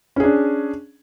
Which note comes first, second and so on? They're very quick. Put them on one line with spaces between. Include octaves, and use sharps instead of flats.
C#4 G#4 D4